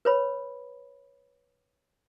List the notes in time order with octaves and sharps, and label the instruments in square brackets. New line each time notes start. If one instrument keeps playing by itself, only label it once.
[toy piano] B4 C#5 B5